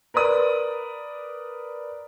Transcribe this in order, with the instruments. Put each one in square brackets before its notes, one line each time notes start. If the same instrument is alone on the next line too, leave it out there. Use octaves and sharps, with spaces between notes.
[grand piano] A#4 B4 D5 D#6